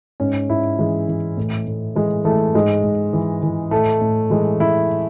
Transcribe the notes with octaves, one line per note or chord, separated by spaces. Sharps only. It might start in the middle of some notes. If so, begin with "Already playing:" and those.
G#2 C#4
G#2 E4
E3 G#3
E3
A2
A2
E3 G#3
E3 A3
G#2 G#3
G#2
E3
E3
A2 A3
A2
E3 G#3
E3 E4